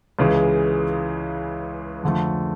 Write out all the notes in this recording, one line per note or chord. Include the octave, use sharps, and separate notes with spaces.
C#2 C#3 E3 G#3
F2 D3 F3 A3